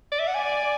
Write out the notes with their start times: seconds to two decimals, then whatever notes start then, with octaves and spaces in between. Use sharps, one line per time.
0.12 D5
0.19 E5
0.27 F#5
0.35 D5 G#5